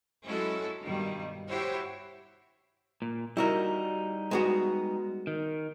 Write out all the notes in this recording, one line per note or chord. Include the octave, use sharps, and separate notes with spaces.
F#3 G#3 C#4 E4 F#4 A4
G2 B2 D#3 G3
E4 F#4 G4 C5 C#5
A#2
G3 D#4 E4 F#4 A#4
G#3 B3 F#4
D#3